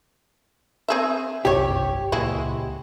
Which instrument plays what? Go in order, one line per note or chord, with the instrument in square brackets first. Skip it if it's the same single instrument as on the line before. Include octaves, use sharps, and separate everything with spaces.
[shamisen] C4 G#4 E5
[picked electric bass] G1 C2 F#2 [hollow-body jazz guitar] G4 C#5
[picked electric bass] C#2 A#2 [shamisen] G#3 E4 F#4